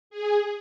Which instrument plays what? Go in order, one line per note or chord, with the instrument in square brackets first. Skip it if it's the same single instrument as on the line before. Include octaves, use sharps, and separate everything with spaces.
[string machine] G#4